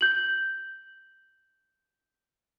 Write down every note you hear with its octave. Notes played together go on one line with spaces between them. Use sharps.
G6 F#7